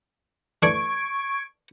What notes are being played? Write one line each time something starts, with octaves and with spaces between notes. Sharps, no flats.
E3 A3 D4 C#6 G#6 D7